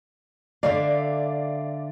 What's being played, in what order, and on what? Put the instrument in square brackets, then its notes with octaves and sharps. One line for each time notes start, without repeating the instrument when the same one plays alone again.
[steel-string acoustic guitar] D3 E5 F5 [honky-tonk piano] D5